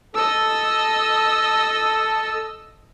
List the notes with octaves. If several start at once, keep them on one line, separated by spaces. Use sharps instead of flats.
A4 D#5 E6